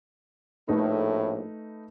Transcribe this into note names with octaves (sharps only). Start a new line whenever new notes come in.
A#1 A2 A3 D#4 B4